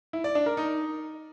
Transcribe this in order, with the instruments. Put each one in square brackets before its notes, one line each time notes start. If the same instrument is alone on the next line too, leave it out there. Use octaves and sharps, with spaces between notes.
[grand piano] E4
D5
D4
A#4
D#4